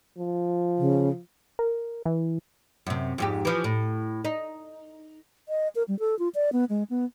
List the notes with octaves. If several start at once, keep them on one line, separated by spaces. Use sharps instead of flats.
F3
C#3
A#4
E3
F#2 C3
F2 G#2 G4
E3 F3
A2
D#4
D#5
A#4
G3
A4
F4
D5
B3
G#3
B3